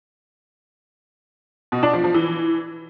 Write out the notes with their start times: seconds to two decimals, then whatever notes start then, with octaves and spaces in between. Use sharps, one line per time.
1.72 B2
1.83 D4
1.93 F3
2.04 F3
2.14 E3